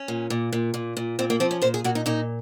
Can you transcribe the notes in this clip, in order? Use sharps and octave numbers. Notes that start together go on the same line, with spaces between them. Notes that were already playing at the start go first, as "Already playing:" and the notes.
Already playing: C#4
A#2
A#2
A#2
A#2
A#2
A#2 C4
A#3
F3 C4
C#4
A#2 C5
G#4
A#2 F#4
D#4
A#2 D#4